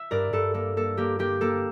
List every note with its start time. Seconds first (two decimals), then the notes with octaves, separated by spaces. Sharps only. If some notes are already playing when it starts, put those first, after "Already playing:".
Already playing: E5
0.11 G2 A#4 D5
0.33 G2 A4
0.54 A#3 A4
0.77 A#3 A4
0.97 A#3 G4
1.19 A#3 G4
1.41 A#3 A4